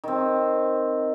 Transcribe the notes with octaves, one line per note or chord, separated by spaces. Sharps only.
D#3 C4